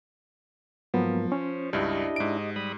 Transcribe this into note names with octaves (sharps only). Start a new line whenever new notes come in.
G#2 F3 F#3 A#3 B3
C#4 C5 C#5
C#2 G2 D4 E4 G4 D#5
G#2 D7
D#5
G3 B5 D#6